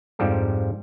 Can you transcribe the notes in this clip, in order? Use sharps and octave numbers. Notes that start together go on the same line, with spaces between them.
F2 G#2 F3 G3 G4 A4